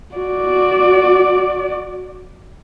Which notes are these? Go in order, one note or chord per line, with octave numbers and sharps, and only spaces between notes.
F#4 D5